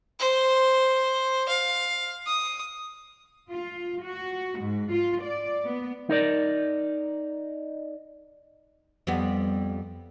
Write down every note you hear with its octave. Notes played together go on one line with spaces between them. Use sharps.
C5
F5
D#6
F4
F#4
G#2
F4
D5
B3
D#4 A#4 D5
F2 G3 B3